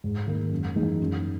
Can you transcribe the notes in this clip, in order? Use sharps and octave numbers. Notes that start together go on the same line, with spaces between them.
G#2
D#3 A#3
F#2
E3 G#3 D#4
F#2